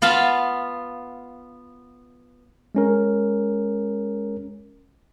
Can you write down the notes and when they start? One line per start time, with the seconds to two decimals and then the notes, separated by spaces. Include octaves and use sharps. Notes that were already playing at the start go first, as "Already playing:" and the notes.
0.02 B3 F4 F5 A5 B5
2.75 G#3 C#4 A#4